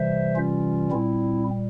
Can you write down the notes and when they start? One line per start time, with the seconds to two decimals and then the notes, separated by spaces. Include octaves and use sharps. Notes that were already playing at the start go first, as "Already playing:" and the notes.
Already playing: C3 E3 G3 C5 E5
0.35 C#4 F4
0.91 A#2 G3 C4 E4